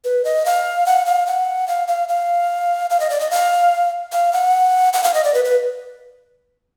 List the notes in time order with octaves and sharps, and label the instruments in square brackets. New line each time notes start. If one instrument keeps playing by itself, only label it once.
[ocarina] B4
D#5
F5
F#5
F5
F#5
F5
F5
F5
F5
D#5
D5
D#5
F5
F5
F#5
F#5
F5
D#5
D5
B4
B4